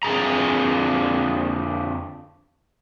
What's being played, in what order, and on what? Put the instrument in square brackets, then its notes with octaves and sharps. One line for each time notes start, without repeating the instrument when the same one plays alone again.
[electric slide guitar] F2 D3 G#4 A#5